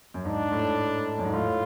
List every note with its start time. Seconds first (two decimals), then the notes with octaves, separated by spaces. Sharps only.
0.14 F#2
0.25 G#2 D4
0.52 A2
1.19 F#2
1.25 G#2
1.33 A2 F4